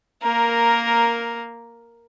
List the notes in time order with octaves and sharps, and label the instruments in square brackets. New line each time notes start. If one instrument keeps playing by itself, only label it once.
[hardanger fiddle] A#3 A#4